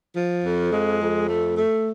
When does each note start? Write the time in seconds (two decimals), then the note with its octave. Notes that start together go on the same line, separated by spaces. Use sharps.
0.16 F3
0.43 F2
0.72 G#3
1.00 F2
1.29 A3
1.57 A3